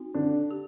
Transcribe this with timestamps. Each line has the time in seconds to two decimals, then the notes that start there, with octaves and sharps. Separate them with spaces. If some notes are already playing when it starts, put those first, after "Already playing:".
Already playing: C4 D#4 F#4
0.14 D3 D4
0.51 G4